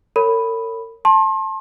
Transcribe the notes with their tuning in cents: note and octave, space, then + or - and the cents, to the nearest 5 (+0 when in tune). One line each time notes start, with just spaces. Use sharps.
A#4 -45 C#5 +0 B5 +0
A5 +0 C6 +35